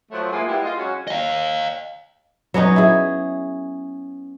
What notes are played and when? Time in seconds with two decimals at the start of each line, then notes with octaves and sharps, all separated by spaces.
0.12 F3 F#3 A3
0.32 G#3 A#3 B3 E4 F4 G#4
0.48 G3 G#3 A#3 B3 E4 G4
0.63 F4 D#5
0.77 F#3 G#3 C#4 F#4
1.08 D#5 F5
2.54 F#3 B3 C#4 D#4
2.76 E4 G#4